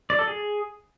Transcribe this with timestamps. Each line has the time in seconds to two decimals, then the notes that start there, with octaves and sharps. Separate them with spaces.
0.10 D5
0.19 A4
0.28 G#4